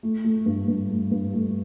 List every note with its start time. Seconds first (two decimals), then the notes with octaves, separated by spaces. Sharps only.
0.03 A3
0.24 A3
0.46 G2
0.68 G2
0.90 A3
1.11 G2
1.33 A3